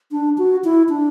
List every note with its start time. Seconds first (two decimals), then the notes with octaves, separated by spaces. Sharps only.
0.11 D4
0.38 F#4
0.64 E4
0.89 D4